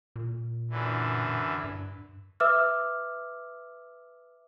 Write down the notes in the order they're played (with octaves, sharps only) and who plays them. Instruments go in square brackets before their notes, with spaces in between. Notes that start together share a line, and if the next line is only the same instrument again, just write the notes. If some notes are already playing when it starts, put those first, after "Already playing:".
[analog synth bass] A#2
[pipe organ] F#2 D3 E3
[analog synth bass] G2
[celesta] B4 E5 D6 E6 F6